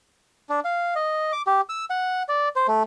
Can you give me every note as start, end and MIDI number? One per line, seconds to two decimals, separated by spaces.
0.49 0.60 62
0.65 0.94 77
0.95 1.32 75
1.33 1.42 86
1.47 1.61 67
1.69 1.85 88
1.90 2.23 78
2.29 2.49 74
2.56 2.67 72
2.68 2.83 57